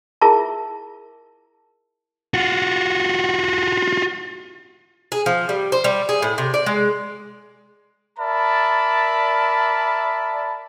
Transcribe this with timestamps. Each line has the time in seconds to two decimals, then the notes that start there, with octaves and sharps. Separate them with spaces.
0.21 E4 F4 G#4 A#4 E5 A5
2.34 F4 F#4
5.12 G#4
5.26 F3
5.49 G3
5.72 C5
5.84 G3
6.09 G#4
6.22 A2
6.38 C3
6.54 D5
6.66 G#3
8.18 A#4 D5 E5 A5 B5